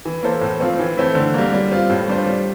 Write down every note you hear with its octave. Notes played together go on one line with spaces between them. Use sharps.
E3
A#3 E4 A4 C5
A2
F3 C4 F4 C5
E3
A3 C4 E4
D3
G3 A#3
G3
C4 F4
A2
G3 D4 F4 C5
G3